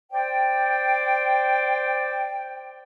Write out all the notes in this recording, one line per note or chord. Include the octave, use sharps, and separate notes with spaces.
C5 D5 G5